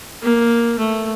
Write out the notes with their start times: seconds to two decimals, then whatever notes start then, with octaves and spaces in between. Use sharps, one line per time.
0.22 A#3
0.79 A3